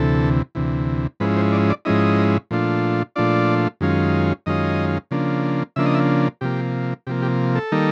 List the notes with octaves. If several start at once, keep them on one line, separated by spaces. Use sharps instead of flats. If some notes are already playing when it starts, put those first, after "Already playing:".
Already playing: D2 C3 E3 A4
D2 C3 E3
G#2 F3 G#3 C#4 E4 B4
C5
D5
D5
G#2 F3 G#3 C#4 E4 D#5
A#2 F3 A3 D4 F4
A#2 F3 A3 D4 F4 D5
F#2 D#3 G#3 C#4 F4
F#2 D#3 G#3 C#4 F4 D#5
C#3 F3 A#3 D4
C#3 F3 A#3 D4 E5
D#5
E5
C3 F3 A#3 G4
C3 F3 A#3 G4
G4
A4
D#3 G3 A#3 D#4